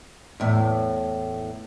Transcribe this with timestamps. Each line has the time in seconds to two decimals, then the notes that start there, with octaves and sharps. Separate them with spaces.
0.40 E2 A2